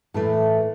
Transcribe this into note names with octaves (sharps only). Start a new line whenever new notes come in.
A2 E3 A3